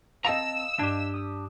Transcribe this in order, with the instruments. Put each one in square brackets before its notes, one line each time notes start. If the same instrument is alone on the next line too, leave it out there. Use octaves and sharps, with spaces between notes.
[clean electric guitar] C4 A5 A#5 [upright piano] D#5 F5 [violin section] E6
[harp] G2 G#6 [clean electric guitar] D4 G4
[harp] D#6 E6 E7